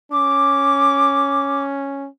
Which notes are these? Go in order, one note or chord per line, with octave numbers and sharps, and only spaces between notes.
C#4 D6